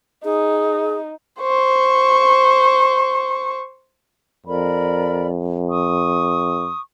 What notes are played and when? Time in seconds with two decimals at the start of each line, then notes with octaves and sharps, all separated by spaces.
0.25 D#4 G#4
1.40 C5 C#6
4.46 F2 A#4 D5 B5
5.69 C#6 D#6